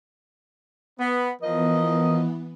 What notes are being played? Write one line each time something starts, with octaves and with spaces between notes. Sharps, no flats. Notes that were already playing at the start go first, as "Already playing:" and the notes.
B3
E3 F3 B3 A#4 D#5